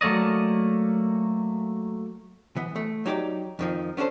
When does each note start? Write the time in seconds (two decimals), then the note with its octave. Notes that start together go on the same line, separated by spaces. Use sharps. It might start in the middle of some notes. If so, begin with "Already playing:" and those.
0.01 F#3 A3 A#3 D5 D#5
2.56 E3 B3
2.76 A3
3.06 F#3 D#4 G4 A4 D5
3.59 F2 D#3 F3
3.97 B3 C#4 D4 A4 C5